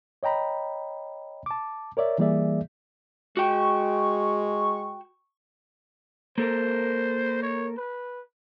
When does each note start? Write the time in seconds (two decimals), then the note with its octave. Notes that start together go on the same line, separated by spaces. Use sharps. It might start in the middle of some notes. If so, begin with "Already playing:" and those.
0.23 C#5 D#5 G5 A#5 B5
1.46 A5 D6
1.97 A#4 C#5 D5 E5
2.18 E3 G3 A#3 G#4 D5 E5
3.37 G#3 F#4 G5 C#6
6.38 A#3 A4 A#4 C5
7.42 C#5
7.77 B4